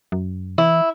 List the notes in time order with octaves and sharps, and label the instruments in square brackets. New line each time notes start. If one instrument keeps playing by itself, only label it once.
[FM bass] F#2
[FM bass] E3 [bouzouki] E4